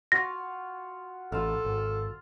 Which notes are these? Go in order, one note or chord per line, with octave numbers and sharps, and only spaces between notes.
F4 F#4 F5 A#6
A1 F4 A4 F5
G#1